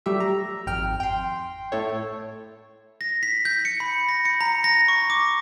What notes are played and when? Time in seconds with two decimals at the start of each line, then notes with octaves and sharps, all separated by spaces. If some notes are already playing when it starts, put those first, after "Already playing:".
0.06 F#3 G3 A3 G4 E5
0.20 A#5
0.66 G#1 F2 G5 F6
1.00 G5 C6
1.72 A2 E4 A4 C#5
3.01 A#6
3.23 B6
3.45 G6
3.65 C#7
3.80 B5
4.09 A#6
4.25 C#7
4.41 A#5
4.64 A#6
4.88 C#6
5.10 D6